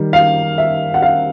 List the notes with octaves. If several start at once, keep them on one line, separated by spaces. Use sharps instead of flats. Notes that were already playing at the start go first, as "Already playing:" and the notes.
Already playing: D#3 G3
F5
E5
F#5
F5